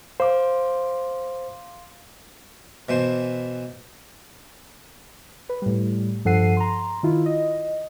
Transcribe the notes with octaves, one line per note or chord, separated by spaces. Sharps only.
C5 F5 C6 D6
B2 E3 C5
B4
A2 G3
G2 F3 A4 F#5 C7 D#7
A#5 C6
D#3 E4 F4
D#5